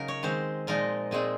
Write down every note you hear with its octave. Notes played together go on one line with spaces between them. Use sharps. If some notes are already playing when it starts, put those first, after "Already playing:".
Already playing: C#3 F#3 A#3 D#4 A#4
C#5
D#3 G#3 C4 C5
A#2 F3 G#3 D#4 A#4
A#2 G#3 C4 G#4